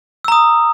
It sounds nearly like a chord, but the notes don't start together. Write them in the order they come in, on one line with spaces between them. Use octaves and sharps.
E6 A#5 D#6